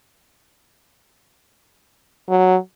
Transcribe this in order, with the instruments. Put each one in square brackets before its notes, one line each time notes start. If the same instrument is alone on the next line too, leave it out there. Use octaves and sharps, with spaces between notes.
[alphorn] F#3